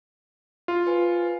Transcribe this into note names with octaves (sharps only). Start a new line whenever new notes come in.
F4
B4 C5 G#5